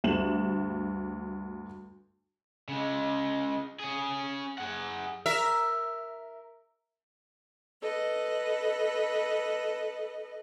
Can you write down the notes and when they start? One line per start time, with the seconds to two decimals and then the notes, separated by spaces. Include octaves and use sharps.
0.04 D2 G2 E7 F#7
2.68 C#3 G#3
3.79 C#4 G#4
4.58 G#4 F#5
5.26 A#4 E5
7.81 A4 B4 D#5